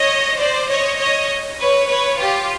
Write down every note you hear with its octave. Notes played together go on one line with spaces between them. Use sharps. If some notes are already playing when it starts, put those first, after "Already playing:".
Already playing: C#5 D#5
C5 D5
C#5 D#5
C#5 D#5
B4 C#5
B4 C#5
F4 G4